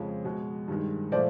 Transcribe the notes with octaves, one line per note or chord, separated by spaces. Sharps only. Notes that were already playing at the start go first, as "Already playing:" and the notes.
Already playing: F2 C#3 F3 G#3
B2 G#3
G2 D#3 G#3
A#2 F3 A3 C5 D5